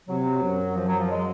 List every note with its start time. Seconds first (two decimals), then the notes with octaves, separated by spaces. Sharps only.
0.08 C3 F#3
0.42 F#2
0.76 F3
0.87 F#3
0.99 F3
1.10 G#3